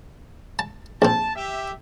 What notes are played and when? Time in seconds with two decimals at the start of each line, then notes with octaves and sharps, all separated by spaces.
0.59 A5
1.02 A#1 C4 A5
1.35 G4 E5